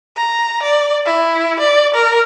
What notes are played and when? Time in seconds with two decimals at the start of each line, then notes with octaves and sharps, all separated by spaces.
0.17 A#5
0.63 D5
1.06 E4
1.60 D5
1.94 A#4